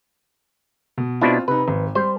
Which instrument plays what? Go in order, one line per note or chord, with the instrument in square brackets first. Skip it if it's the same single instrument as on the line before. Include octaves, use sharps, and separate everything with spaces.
[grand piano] B2
[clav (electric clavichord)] B2 D4 E4 [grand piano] C4 F4
[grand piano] C3 D#4 [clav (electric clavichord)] B4
[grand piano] G#1
[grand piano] G3 [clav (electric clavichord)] C5